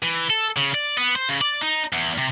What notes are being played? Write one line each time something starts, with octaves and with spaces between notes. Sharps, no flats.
E3
A4
C#3
D5
B3
C5
C#3
D5
D#4
E2
C3